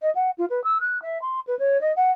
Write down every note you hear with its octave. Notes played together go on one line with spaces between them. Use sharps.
D#5
F#5
F4
B4
E6
F#6
E5
C6
B4
C#5
D#5
F#5